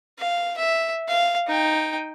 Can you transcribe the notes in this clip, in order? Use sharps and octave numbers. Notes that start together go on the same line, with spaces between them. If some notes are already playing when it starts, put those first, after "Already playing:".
F5
E5
F5
D#4 G5